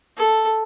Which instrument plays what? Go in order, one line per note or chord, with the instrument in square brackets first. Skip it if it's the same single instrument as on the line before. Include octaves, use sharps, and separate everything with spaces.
[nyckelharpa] A4